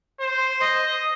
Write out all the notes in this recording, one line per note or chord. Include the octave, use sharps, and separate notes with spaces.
C5
D#5